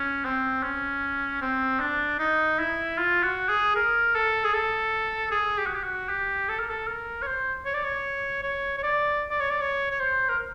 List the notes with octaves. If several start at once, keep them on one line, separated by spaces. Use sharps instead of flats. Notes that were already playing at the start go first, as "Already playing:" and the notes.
Already playing: C#4
C4
C#4
C4
D4
D#4
E4
F4
F#4
G#4
A#4
A4
G#4
A4
G#4
G4
F#4
G4
F#4
G4
A4
A#4
A4
A#4
C#5
C5
C#5
D5
C#5
C#5
C#5
D5
D5
C#5
D5
C#5
C#5
C5
A#4